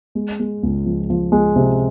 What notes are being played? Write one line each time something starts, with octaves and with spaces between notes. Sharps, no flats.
G#3
G#3
C#2
F3
F3
G#3
C3